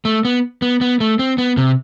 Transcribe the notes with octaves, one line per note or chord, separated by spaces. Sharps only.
A3
B3
B3
B3
A3
C4
B3
C3